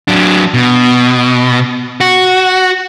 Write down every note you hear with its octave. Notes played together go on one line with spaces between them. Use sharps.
F#3 D4
B2
F#4